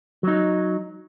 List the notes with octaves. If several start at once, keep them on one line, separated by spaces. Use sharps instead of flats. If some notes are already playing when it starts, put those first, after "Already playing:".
F#3 D#4